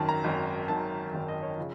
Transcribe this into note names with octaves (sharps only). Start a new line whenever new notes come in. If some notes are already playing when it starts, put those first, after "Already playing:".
Already playing: G#1 F#2 D#3 A5
A#5
G#1 F#2 D#3
G#1 F#2 D#3 A5
G#1 F#2 D#3 G5
D#5
C#5
C#3 F3